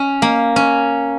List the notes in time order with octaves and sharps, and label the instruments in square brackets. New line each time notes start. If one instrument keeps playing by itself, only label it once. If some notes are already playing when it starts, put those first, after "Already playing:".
Already playing: [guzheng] C#4
A#3
C#4